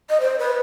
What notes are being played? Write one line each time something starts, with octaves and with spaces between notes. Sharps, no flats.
D#5
C5
B4